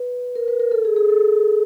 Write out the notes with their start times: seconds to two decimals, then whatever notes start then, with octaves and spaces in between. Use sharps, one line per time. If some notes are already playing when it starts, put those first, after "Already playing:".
Already playing: B4
0.35 A#4
0.48 B4
0.60 A#4
0.71 A4
0.85 G#4
0.96 G#4
1.09 A4